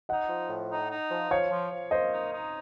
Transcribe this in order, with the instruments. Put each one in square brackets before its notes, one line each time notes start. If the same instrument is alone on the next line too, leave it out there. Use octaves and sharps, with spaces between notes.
[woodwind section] D#4 [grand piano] D#5 F#5
[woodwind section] F3
A2
D#4
D#4
F3
[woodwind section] F3 [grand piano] C#5 F5
[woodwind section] F3
F3
[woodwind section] A#3 [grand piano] C5 D#5
[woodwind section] D#4
D#4